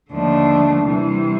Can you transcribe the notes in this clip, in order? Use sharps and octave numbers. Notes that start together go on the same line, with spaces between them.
D#2 D3 F3 A3 D4
C3 E3 G3